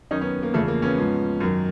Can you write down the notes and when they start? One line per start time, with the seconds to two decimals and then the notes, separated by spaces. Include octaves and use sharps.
0.11 F#2 D#3 C#4 D#4
0.21 B3 C#4
0.43 A#3
0.54 E2 C#3 F3 A3
0.68 A#3
0.82 B3 C#4
0.98 G#2 F3
1.40 F#2 D#3